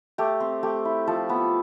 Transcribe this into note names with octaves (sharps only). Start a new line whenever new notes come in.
A3 G4
C4
A3 G4
E4
F3 A4
B3